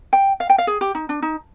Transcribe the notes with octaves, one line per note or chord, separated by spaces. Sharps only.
G5
F5
G5
F5
G#4
G4
D#4
D4
D#4